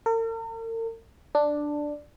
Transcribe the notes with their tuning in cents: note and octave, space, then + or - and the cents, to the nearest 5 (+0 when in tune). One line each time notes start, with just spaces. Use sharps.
A#4 -45
D4 +5